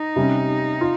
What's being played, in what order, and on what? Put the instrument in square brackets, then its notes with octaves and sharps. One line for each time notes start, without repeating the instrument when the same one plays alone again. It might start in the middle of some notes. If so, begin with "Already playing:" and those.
Already playing: [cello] D#4
[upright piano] C3 G3 C#4
F4